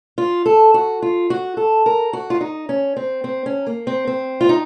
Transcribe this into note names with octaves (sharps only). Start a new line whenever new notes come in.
F4
A4
F#4
F4
F#4
A4
A#4
F#4
F4
D#4
C#4
C4
C4
C#4
A#3
C4
C4
F4
D#4